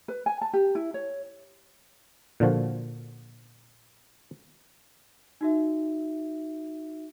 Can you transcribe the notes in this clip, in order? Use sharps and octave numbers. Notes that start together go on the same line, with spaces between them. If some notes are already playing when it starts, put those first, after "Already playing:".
B4
G#5
A5
G4
E4
C#5
A#2 D3 F3 F#4
D#4 F#4 E5